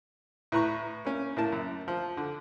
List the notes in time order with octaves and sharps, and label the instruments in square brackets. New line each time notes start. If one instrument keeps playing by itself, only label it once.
[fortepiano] A2 B4 A#5 C#6
A#3 C#4
A2 A#3 A5
F#2
F3
D3